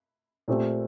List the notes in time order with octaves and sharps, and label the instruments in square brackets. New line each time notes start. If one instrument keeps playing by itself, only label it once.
[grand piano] A#2 A3 C4 G4